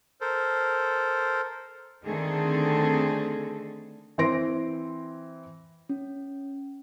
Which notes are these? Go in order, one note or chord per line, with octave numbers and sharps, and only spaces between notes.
A4 A#4 C5
D3 D#3 A3 C4 G#4 A4
E3 C4 C6 A#6 D7
C#4